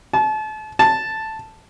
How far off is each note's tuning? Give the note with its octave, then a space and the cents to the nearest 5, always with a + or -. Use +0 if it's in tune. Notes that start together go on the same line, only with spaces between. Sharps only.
A5 -35
A5 +0